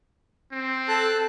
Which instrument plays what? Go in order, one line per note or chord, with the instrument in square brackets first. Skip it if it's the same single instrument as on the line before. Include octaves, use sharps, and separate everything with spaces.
[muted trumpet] C4
[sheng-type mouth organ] A4 A5 F#6